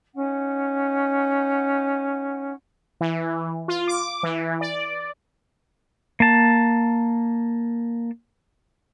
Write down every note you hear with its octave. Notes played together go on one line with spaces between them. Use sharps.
C#4 D#4 F#5
E3
F4
D6
E3
D5
A#3 A5